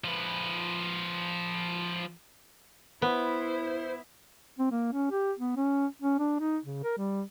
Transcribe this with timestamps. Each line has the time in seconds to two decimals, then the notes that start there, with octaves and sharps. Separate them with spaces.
0.04 F3 B4
3.02 B3 E4 C5
4.59 C4
4.72 A#3
4.92 C#4
5.11 G4
5.39 B3
5.56 C#4
6.02 C#4
6.19 D4
6.40 D#4
6.65 C#3
6.83 A#4
6.98 G3